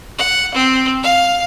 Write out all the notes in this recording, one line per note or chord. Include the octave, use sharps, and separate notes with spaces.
F#5
C4
F5